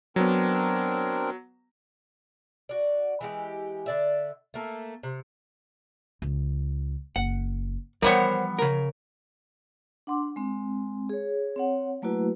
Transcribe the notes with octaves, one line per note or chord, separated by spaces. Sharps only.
F#3 B3 C4 D4 A#4
F#4 D5
E3 G#3 G4
D3 D5 E5
A3 A#3 A4
C3
C#2
F#1 F#5
E3 F3 G3 B3 A#4 C5 C#5 F#5
C#3 A#4
D4 F#5 C6 D6
G#3 C4
G#4 C#5
C4 C#5 F#5
F#3 A3 A#3 E4 F#4 B4